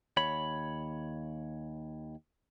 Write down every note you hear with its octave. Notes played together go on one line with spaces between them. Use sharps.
D#2 C#5 B5